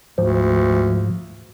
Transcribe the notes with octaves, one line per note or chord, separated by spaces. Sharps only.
D2 G#2 F3